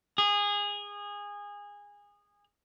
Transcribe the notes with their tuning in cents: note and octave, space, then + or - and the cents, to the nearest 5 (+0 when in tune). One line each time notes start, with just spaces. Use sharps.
G#4 -20